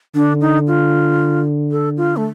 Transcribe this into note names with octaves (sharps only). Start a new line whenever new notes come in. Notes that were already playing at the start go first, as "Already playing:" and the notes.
D3 D4
D#4
F4
A4
F4
A3